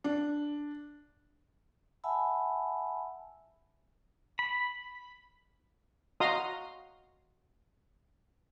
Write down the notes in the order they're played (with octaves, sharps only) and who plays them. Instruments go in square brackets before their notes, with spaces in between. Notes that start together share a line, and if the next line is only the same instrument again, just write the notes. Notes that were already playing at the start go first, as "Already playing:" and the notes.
[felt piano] D4
[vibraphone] E5 F#5 G#5 A5 B5 E6
[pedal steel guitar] B5
[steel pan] F#4 D#5 F5 A#5 C6 D#6